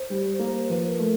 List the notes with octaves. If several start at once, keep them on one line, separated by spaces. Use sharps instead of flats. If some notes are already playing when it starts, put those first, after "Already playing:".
Already playing: C5
G3
A#3
F3 B4
A#4
A3